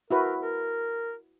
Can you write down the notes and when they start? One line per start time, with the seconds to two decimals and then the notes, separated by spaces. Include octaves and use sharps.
0.11 E4 F#4 A#4 B4
0.40 A#4